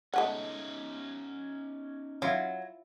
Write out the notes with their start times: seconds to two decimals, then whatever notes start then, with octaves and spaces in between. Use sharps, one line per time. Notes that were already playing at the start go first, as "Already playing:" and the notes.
0.14 G#3 A3 C#4 D#4 F#5
2.22 F#3 E4 F4